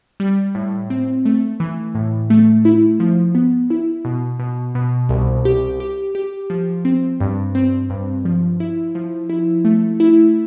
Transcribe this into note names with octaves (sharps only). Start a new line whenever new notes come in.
G3
A2
C4
A3
E3
A2
A3
E4
F3
B3
E4
B2
B2
B2
C2
G4
G4
G4
F3
C4
G2
C4
G2
F3
E4
F3
E4
A3
E4